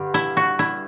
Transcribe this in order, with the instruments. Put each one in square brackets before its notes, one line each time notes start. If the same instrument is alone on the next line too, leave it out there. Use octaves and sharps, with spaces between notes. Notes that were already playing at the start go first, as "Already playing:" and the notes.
Already playing: [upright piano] G2 D3
[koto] E4
F#4
E4